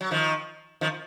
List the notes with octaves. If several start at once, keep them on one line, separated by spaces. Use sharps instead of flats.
F#3
D#3 F3
D#3 F3